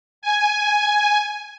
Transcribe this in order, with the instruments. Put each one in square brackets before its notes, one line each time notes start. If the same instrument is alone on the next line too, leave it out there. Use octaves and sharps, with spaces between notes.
[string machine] G#5